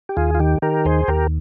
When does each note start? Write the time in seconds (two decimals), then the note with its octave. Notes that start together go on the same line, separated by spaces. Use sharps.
0.09 G4
0.17 D#2 F4 G#4
0.35 F4
0.40 D#3 G4
0.62 D#3 G4 A#4
0.85 D#2 G#4 C5
1.08 D#2 G4 A#4